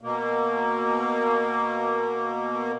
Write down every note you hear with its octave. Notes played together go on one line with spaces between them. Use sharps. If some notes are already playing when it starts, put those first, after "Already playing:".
B2 A#3